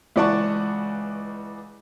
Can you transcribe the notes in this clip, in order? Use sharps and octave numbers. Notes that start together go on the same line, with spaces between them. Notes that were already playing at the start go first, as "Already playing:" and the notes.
C#2 E3 D5 F#5 A5 C#6